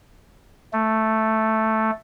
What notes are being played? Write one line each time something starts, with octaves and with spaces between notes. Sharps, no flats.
A3